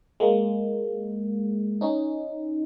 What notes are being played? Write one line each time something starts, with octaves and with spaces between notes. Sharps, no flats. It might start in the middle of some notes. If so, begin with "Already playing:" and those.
G#3 A#3
C#4 D#4